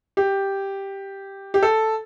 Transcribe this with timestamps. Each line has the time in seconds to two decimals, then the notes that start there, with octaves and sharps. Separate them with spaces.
0.17 G4
1.54 G4
1.63 A4